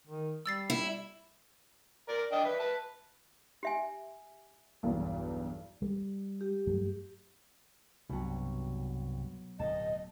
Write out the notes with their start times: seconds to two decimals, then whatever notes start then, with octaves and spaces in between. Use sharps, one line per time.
0.07 D#3
0.46 G3 E6 A6 C7
0.70 E4
2.09 A#4 D5
2.32 D4 D#5 G5
2.45 B4 E5
2.59 B4 A5
3.63 G4 E5 G#5
4.83 B1 E2 G2
5.82 G3
6.41 G4
6.67 G2 F#3 A3
8.09 C2 G2 B2 F#3
9.60 D1 B2 D#5 A5